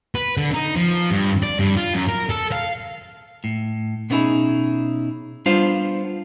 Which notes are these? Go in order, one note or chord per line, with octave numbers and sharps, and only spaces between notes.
B4
D3
D#4
F3
G2
D5
G2
F4
F#2
A#4
A4
F5
A2
B2 B3 C#4 D#4 E4 G#4
G3 B3 D4 F4 C5 F5